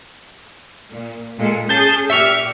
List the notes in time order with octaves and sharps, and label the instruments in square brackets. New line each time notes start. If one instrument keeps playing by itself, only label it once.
[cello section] A#2
A#2 G#3 A4
[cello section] C#4 G#4 [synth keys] A5 G6
[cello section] A#2 G4 [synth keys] E5 C#6 F6